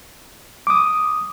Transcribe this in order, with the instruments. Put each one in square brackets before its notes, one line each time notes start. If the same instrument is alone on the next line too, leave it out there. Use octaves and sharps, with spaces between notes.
[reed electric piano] D6 D#6